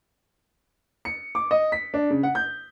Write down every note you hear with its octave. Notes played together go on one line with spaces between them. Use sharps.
C#7
D6
D#5
B6
D4
C#3
F#5
G6